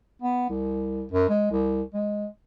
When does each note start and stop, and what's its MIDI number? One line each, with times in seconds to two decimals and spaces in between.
0.22 0.45 59
0.49 1.04 36
1.12 1.29 42
1.29 1.51 56
1.51 1.82 36
1.94 2.26 56